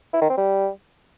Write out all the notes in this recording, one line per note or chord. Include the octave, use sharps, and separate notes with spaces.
E4
D#3
C4
G3